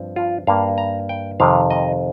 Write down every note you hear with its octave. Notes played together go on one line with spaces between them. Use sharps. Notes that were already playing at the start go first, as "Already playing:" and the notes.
Already playing: G2 F3 C4
F4
G2 G3 A#3 F5
A#5
G5
F2 C3 D#3 F5
D#5